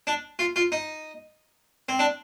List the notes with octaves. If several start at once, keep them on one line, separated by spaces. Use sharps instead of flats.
D4
F4
F4
D#4
C4
D4